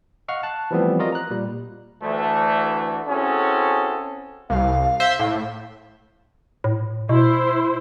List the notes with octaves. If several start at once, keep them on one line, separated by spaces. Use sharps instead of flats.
D#5 F5 F#5 C#6 F6
A5 F#6
E3 F3 G3 A3 B3 C4
F4 F#4 A#4 D5 D#5
A#5 F#6
A#2 G3
D2 E3 A3
C4 C#4 E4 F#4 G#4 A4
C2 F5
C5 E5 C6
A2
A2
B2 E4 C5